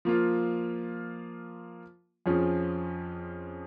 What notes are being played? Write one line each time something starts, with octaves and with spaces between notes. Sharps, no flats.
F3 A#3 F4
F2 F3 C#4 G#4